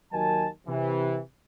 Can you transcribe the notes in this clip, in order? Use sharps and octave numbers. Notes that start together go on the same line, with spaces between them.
D#2 F#3 A#4 D#5 G#5 A5
C3 E3